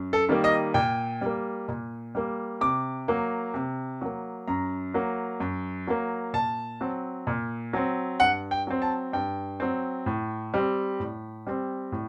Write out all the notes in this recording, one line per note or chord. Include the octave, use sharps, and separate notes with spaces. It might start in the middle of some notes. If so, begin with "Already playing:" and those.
Already playing: F#2
A4
D#3 G3 A#3
D#5
A#2 G5
G3 A#3
A#2
G3 A#3
C3 D6
F#3 A#3
C3
F#3 A#3
F#2 A#5
F#3 A#3
F#2
F#3 A#3
A#2 A5
F#3 C4
A#2
F#3 C4
G2 F#5
G5
F#3 C4
A5
G2 G5
F#3 C4
A2
G3 C4
A2
G3 C4
A2